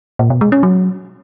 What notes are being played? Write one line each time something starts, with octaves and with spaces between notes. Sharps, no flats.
A#2
B2
G#3
C#4
F#3